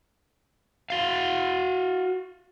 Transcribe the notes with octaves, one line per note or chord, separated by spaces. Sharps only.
F#4 F5